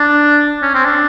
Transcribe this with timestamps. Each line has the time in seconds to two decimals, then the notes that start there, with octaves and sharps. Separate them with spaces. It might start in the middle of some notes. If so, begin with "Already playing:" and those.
Already playing: D4
0.62 C#4
0.74 C4
0.85 D4